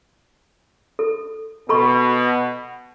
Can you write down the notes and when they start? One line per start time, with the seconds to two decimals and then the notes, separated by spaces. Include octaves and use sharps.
0.99 A4
1.69 B2 A4 B5 C#6